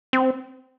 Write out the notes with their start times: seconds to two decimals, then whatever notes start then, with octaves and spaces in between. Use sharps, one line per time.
0.13 C4